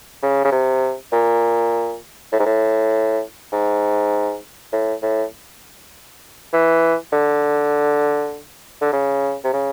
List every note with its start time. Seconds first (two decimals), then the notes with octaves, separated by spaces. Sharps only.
0.23 C#3
0.44 C#3
0.52 C3
1.12 A#2
2.32 A2
2.39 G#2
2.46 A2
3.52 G#2
4.73 A2
5.02 A2
6.53 E3
7.12 D3
8.81 D3
8.93 C#3
9.44 C3
9.53 C#3